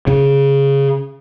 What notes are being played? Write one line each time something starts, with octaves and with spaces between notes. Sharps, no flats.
C#3